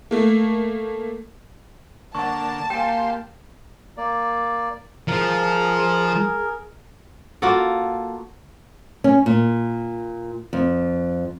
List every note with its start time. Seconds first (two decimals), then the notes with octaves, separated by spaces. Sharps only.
0.11 A3 A#3
2.15 D3 A#3 F#5 A5 C#6
2.70 A#3 G4 G5 G#5 C6
3.97 A#3 D5
5.08 F3 F4 G#4 A#4
7.42 A#3 F4 F#4 A4
9.04 C#4
9.26 A#2
10.53 F2